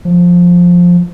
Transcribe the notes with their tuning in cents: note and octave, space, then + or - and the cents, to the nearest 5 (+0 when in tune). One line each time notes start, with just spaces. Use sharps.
F3 +10